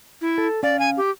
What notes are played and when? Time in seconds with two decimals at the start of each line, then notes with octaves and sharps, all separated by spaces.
0.21 E4
0.38 A4
0.63 C#4 D5 F5
0.79 G#5
0.97 G4